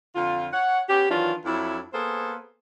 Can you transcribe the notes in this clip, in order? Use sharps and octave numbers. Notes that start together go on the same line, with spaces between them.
F2 D3 F4
C#5 F#5
B3 C#4 G4
D#3 E3 F#3 D4 F4
F2 F#3 D4 E4
A#3 B3 G#4 A4 C5